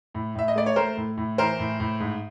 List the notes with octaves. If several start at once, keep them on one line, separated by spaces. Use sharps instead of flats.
A2
A2 E5
D#5
A3 D5
C#5
A3 A#4 C5
A2
A2
E3 A#4 C5
A2
A2
G#2